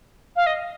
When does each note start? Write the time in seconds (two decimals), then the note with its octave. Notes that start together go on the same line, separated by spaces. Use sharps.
0.36 F5
0.46 D#5